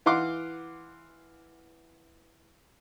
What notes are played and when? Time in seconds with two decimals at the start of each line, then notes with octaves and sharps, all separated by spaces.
0.06 E3 F5 F#5 C6 D6